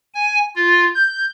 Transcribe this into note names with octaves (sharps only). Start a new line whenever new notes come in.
G#5
F4
G6